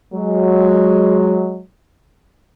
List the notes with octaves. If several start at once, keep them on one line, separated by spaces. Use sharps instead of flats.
F#3 G#3